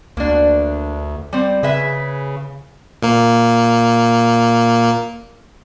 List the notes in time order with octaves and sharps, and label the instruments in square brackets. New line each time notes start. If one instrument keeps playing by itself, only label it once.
[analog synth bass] D2 [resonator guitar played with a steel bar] A#3 D4
[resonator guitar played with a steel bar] G3 C4
[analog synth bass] C#3 [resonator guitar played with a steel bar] G#4 B4 E5
[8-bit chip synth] A#2 A#3